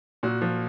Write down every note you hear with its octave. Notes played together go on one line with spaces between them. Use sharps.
A#2 F#4
F3